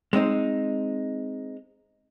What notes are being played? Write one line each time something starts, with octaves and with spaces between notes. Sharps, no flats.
G#3 C4 D#4 C5